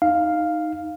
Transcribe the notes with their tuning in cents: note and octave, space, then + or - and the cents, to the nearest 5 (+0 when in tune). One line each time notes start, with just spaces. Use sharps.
D#4 +0 F5 +0